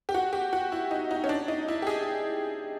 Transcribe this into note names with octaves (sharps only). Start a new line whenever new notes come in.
G4
F#4
G4
F#4
E4
D#4
D#4
C#4
D4
D#4
E4
G4
G#4